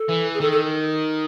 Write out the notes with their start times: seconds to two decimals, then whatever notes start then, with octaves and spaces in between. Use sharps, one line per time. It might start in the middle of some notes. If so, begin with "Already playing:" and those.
Already playing: A4
0.09 E3
0.34 G#4
0.41 D#3 A4
0.52 A4